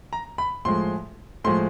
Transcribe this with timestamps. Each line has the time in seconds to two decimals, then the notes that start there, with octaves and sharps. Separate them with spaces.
0.13 A#5
0.38 B5
0.65 A2 F3 G#3 C6
1.44 A2 F3 G#3 C6